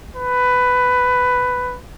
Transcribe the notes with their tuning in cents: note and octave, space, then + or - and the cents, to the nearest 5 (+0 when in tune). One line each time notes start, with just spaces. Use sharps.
B4 +10